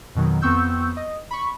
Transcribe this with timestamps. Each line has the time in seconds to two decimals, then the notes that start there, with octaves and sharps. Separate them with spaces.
0.15 F2 B2 D#3 F#3
0.42 F2 B3 C4 C#6 E6 G6
0.97 D#5
1.31 B5 C#6